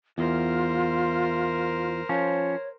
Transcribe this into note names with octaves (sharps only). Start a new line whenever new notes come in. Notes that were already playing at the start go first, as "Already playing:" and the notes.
E2 F4 A#4 C5
F3 C#4 C#5